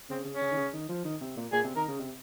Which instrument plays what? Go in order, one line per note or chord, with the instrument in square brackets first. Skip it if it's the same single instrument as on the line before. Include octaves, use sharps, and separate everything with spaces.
[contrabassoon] C#3 [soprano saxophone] C4
[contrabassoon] C#3
[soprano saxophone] C#4
[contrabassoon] C#3
D#3
C#3
D#3
F3
D#3
C3
A#2
[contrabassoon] A#2 [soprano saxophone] G#4
[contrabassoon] C3
[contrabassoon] D#3 [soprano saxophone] A#4
[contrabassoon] C#3
C3